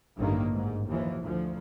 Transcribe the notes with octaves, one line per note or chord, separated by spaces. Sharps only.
A1 G2 D3 D#3 A#3
G#2
D#2 E3 F3
D2 F3